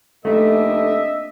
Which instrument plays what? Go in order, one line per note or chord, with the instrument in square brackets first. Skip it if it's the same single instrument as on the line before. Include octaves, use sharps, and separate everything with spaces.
[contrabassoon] F1 [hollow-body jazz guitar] A3 [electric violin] A#3 D4 [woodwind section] D#5 E5